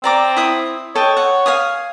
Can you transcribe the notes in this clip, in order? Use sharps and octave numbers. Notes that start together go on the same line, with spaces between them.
C4 D5 A#5 D6
E4 D#6
A4 C#5 D#5 G5
F#5
F5 G#5 D#6